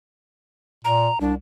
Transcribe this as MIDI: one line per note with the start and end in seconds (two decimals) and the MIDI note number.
0.85 1.09 46
0.85 1.18 82
1.21 1.34 36
1.21 1.34 62